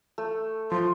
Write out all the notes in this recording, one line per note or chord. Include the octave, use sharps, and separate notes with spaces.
A3
F3 C6